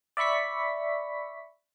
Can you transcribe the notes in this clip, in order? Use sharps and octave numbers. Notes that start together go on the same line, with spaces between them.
D5 E5 B5 C#6 B6